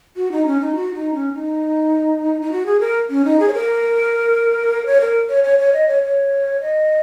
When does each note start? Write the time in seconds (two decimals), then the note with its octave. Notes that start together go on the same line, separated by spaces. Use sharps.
0.16 F#4
0.32 D#4
0.46 C#4
0.60 D#4
0.76 F#4
0.94 D#4
1.14 C#4
1.34 D#4
2.42 D#4
2.52 F#4
2.66 G#4
2.80 A#4
3.10 C#4
3.25 D#4
3.40 G#4
3.48 C#5
3.54 A#4
4.86 C#5
5.01 A#4
5.29 C#5
5.44 C#5
5.59 C#5
5.73 D#5
5.88 C#5
6.03 C#5
6.61 D#5